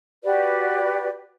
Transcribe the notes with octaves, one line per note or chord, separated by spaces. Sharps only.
F#4 G4 B4 D5